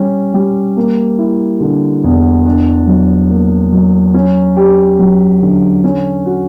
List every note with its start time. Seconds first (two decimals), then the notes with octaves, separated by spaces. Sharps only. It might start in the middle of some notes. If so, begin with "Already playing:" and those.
Already playing: G3 C#4
0.34 G3
0.77 A#3
1.19 E4
1.60 D3
2.04 E2
2.46 D4
2.87 F#3
3.30 A#3
3.72 F#3
4.14 C#4
4.57 G4
4.99 F#3
5.42 D3
5.84 C#4
6.26 F#4